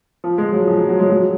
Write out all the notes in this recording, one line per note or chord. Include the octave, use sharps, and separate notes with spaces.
F3
G#3
F#3
F3
F#3
F#3
G#3
F#3